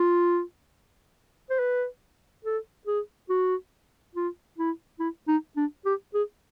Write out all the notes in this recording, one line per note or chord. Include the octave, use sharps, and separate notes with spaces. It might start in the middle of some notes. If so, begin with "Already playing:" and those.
Already playing: F4
C5
B4
A4
G#4
F#4
F4
E4
E4
D#4
D4
G4
G#4